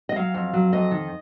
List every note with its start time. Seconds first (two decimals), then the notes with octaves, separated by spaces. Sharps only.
0.09 D#5
0.16 F#3 F5
0.34 F2
0.53 F#3
0.72 F2 D#5
0.91 D#3